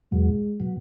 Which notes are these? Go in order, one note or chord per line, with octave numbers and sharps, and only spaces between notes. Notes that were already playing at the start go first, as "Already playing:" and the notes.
E2 B2 F#3 G#3
B2 F#3